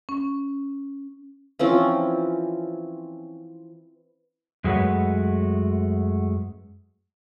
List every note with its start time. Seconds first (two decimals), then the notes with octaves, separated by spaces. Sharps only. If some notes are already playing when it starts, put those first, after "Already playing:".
0.09 C#4
1.59 E3 F3 C4 C#4
4.64 F#2 G#3 A3 F#4 B4 C#5